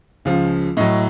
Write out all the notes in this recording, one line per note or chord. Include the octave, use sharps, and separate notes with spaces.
C#2 C#3 F3
A2 F#3 D#5